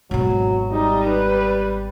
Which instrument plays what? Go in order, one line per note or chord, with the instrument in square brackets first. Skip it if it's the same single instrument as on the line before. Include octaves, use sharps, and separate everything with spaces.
[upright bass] G#1 B2 [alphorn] F#3
[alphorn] G3 [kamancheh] D#4
[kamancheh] B4